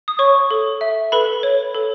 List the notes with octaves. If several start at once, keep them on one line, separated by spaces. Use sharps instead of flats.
D#6
C#5 C#6
A4
E5
A4 B4 B5
C#5
A4